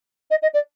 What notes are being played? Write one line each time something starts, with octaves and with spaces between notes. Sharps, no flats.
D#5
D#5
D5